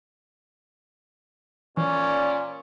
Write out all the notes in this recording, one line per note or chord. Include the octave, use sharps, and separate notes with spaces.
A#2 E3 C#4 D5